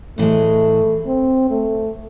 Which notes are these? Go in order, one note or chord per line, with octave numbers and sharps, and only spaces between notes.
A2 E3 G#3 A3
C4
A3